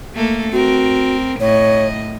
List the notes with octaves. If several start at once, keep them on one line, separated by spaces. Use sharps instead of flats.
A3 A#3 A4
C4 F#4 A#4
A2 C#5 D#5